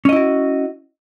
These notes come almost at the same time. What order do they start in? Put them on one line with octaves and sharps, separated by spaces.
C#4 D#5 E4 F#4